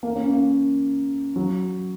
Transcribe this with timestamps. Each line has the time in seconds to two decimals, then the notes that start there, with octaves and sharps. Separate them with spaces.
0.03 A#3
0.16 C#4
0.29 A#3
1.36 F#3